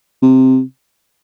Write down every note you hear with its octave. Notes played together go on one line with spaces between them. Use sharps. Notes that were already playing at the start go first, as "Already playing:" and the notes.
C3